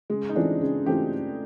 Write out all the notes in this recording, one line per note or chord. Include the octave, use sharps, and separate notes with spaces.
C#3 G#3
D#4
E3 A3 C4 D4 F4
C#3 G#4
E3 A3 C4 F4 G4